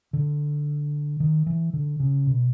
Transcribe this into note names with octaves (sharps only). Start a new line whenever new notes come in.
D3
D#3
E3
D3
C#3
B2